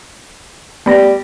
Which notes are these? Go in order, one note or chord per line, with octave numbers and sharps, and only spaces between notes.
G3 A3 B3 A#6